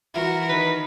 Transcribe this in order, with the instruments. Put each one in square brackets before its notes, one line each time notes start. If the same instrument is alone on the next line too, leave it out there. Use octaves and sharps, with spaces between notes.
[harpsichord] E3 E4 [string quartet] F#4 A#4 B4
[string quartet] D#3 [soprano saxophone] B4